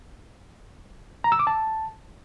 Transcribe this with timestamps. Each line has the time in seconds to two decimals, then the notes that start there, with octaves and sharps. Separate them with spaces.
1.24 A#5
1.32 E6
1.39 D6
1.47 A5